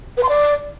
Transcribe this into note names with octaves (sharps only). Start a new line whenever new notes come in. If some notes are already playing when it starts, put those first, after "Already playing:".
B4
C6
D5